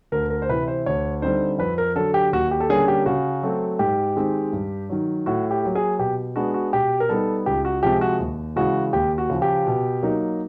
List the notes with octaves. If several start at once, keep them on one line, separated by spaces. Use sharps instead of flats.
D2 A#4
A#4
C5
C3 E3 B4
C5
D2 C#5
D3 G3 C4 D#4 C5
F2 B4
A#4
D3 F#3 A4
G4
D#2 F#4
G4
A4
D3 G3 A#3 C#4 G#4
G4
C#3 F#4
F#3 A3 C4
G#2 G4
D#3 G#3 C4
G2
D#3 F#3
A2 F#4
G4
F#3 A#3
G#4
B2 G4
G#3 B3 D4 F#4
F#4
B2 G4
A#4
G3 B3 D#4 A4
C#2 G4
F#4
C3 F3 G#3 C4 G4
F#4
D#2
C#3 E3 G#3 F#4
D#2 G4
F#4
C#3 F3
G4
B2
F#3 A#3 D#4